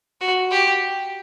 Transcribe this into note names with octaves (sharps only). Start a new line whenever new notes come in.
F#4
G4